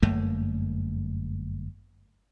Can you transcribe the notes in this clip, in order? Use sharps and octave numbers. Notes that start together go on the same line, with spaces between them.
G1 F#2 A3 A#3